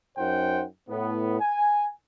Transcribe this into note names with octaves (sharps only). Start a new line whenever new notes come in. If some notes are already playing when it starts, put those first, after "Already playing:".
F#2 D#4 C5 F#5 G5
A2 B3
G#5